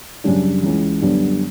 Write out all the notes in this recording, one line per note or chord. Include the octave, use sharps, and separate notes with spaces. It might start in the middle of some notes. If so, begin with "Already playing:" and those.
F#2 C#3 G3 D4
C#2 C#3 E3
F#2 D3 G3 B3 D4